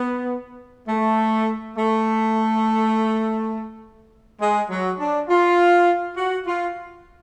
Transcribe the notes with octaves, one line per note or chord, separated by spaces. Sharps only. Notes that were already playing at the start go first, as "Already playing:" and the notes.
Already playing: B3
A3
A3
G#3
F#3
D4
F4
F#4
F4